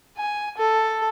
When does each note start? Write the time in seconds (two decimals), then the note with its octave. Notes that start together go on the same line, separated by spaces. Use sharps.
0.17 G#5
0.58 A4